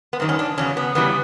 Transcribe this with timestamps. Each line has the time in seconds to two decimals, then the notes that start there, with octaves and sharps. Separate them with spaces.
0.13 B3
0.20 F#2 D#3 G3 C4
0.29 C#4
0.39 D4
0.58 E2 C#3 F#3 C#4
0.77 B3
0.95 F#2 C#3 E3 G3 B3